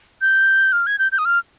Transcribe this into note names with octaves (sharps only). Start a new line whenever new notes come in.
G6
F6
G#6
G6
G6
D#6
F6